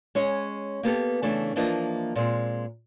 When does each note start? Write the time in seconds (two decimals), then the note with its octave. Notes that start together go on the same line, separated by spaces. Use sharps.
0.15 G#3 C#4 C#5 D#5
0.83 A#3 B3 G4 A4
1.22 C#3 E3 A3 D4
1.56 E3 F3 A#3 D4 C5 D#5
2.16 A#2 G#3 C4